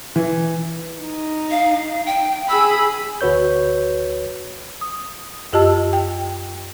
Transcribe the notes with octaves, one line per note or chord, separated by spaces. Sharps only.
E3
D#4
F5
G5
G#4 B5 E6
D2 F#4 B4 C#5 G6
D#6
F#2 F4 G4 D#5 A5 E6
G5